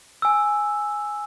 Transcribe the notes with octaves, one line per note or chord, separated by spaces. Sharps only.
G#5 E6